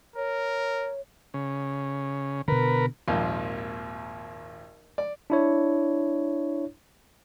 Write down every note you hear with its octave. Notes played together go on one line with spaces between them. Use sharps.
A#4 C#5
C#3
B2 D3 A#4 B4
G#1 D#2 A#2 F3
D5
D4 E4 C#5